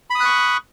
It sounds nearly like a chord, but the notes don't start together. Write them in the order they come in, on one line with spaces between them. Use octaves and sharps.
B5 D#6 F#6 C#6